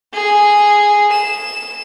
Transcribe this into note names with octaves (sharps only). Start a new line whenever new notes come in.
G#4
E7